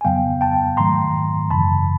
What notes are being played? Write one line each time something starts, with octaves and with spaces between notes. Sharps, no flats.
G#5
F2 C#3 F#3 B3 F5 G5
G5 A5
G#2 D#3 F#3 A3 A#5 C6
F#2 C#3 E3 A5 B5